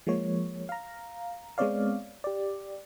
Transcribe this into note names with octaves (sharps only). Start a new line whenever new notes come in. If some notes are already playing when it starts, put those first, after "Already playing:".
F3 G#3 A#3 C#5
F5 A#5
G#3 B3 C4 C#5 D5 F5
G4 D5